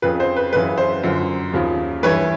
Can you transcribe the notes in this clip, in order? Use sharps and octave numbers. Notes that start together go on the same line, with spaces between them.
F2 C#3 F3 B4
C5
B4
F#2 C#3 E3 B4
C5
F#2 D3 F3
D#2 C#3 F3
G2 E3 B4 C#5